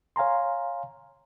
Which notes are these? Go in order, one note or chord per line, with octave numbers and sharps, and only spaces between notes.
C#5 F5 G#5 A#5 C6